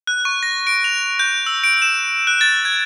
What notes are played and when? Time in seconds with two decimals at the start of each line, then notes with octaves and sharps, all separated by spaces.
0.07 F#6
0.25 C#6
0.43 A#6
0.67 D7
0.84 F7
1.19 G6
1.46 E6
1.64 D7
1.82 E7
2.27 F#6
2.41 A6
2.65 G#6